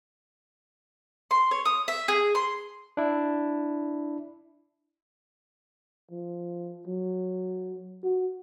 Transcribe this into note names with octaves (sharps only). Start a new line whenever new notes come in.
C6
C#5
D#6
E5
G#4
C6
D4 E4
F3
F#3
F#4